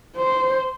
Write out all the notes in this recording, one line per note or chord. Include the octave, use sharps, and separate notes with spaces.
C5